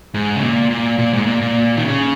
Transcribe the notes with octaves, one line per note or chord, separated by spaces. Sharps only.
G#2
C#3
A#2
A#2
A#2
G#2
A#2
A#2
D#3
C#3